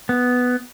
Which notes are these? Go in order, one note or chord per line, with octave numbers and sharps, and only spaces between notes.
B3